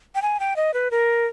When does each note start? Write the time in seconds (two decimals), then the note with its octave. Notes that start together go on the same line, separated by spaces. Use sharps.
0.15 G5
0.22 G#5
0.40 G5
0.56 D#5
0.74 B4
0.91 A#4